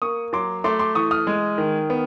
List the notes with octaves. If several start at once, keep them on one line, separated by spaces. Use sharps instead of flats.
A#3 C#6 D#6
F#3 C6 D6
A3 C6 D6
C6 D6
E3 C#6 D#6
D#6 F6
G#3
D#3
B3